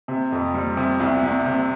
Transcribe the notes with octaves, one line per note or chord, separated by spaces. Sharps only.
C3
F2
G3
C3
C2
C2
C3